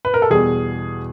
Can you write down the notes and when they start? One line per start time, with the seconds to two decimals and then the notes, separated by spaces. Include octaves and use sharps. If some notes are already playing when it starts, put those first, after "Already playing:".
0.05 B4
0.14 A#4
0.22 A4
0.30 E2 B2 G3 G#4